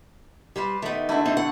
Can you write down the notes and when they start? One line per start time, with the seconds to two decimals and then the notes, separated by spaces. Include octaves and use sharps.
0.56 G3 G4 B4 C5
0.82 D#3 A3 B3 D#4
1.09 D3 A3 E4 F#4 A#4
1.25 C4 D#4
1.37 F#5